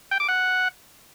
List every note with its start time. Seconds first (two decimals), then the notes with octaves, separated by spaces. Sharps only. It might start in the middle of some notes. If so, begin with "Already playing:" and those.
0.11 G5
0.20 D6
0.28 F#5